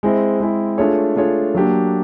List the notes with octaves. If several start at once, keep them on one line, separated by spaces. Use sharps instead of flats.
G#3 C4 E4
G#3 C4 E4
A3 D4 F4 G#4 C#5
A3 D4 F4 G#4 C#5
F#3 A#3 D4 G4